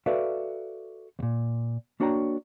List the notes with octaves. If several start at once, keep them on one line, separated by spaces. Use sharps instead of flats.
F#4 A4 B4 D5 E5 F5
D#2 A#2
A#3 D4 F#4 C#5 G5 A#5